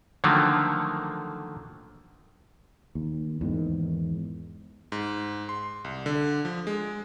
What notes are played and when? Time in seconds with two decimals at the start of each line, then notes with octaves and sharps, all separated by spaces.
0.24 D3 D#3 F3 F#3 A3 A#3
2.95 D#2
3.41 E2 G#2 D#3
4.92 G#2
5.49 C6
5.84 C2
6.06 D3
6.45 F3
6.67 G#3